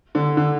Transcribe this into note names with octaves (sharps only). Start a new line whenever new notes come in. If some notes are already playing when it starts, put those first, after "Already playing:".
D3
D3